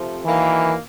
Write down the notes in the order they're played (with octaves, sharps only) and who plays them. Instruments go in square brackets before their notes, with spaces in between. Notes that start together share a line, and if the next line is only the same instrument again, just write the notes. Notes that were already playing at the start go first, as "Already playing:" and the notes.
Already playing: [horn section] C3 F3 A3
[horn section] D#3 F#3 A#3 [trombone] E3